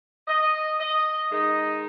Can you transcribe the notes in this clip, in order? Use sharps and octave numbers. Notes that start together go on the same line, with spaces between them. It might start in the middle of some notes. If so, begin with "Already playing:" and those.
D#5
D#5
D#3 G#3 D#4 D#5